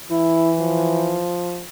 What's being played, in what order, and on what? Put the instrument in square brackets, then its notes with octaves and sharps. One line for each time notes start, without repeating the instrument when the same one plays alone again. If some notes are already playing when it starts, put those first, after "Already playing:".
[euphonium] E3 [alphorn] E4
[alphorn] F3